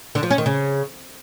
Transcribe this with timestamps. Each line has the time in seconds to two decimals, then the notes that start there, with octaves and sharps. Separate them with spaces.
0.15 D3
0.23 F3
0.30 C#4
0.38 D#3
0.46 C#3